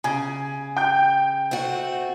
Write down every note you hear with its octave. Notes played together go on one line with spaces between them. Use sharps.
C#3 G#5 G#6
G5 G6
A3 C4 F#4